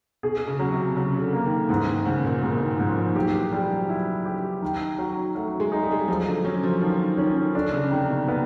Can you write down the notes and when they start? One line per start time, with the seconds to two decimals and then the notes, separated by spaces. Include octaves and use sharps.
0.23 B2 G#4
0.47 C#3
0.59 F#3
0.72 C3
0.97 C#3 F#3
1.14 C#3
1.20 D3
1.33 A#3
1.45 D#3
1.69 G#2 E3
1.87 D#3
2.05 G#2 C#3
2.25 A#2
2.42 G#2 B2
2.61 D#3
2.79 G#2 F3
2.97 F3
3.15 F#3 G4
3.34 E3
3.46 F#3
3.53 F3 G3
3.70 F#3
3.89 E4
4.26 G4
4.62 D#3
4.99 F#3
5.35 F#3 A3
5.60 G#3
5.72 D#4
5.83 G3
5.92 G#3
5.99 G3
6.08 F3 F#3
6.27 D3
6.45 F#3 C#4
6.64 F3
6.81 D#3 F3
7.18 D#3 C#4
7.37 D#3
7.55 D3 D4
7.68 D3
7.73 C#3
7.91 C3 D#3
8.09 B2
8.27 C3 B3